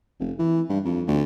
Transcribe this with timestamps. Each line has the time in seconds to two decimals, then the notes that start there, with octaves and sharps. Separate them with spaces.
0.19 F1
0.39 E3
0.69 G2
0.85 F2
1.07 D2